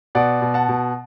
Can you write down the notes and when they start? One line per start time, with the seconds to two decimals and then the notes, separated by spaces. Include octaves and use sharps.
0.15 B2 D5 F#5
0.42 B2
0.54 F#5 A5
0.69 B2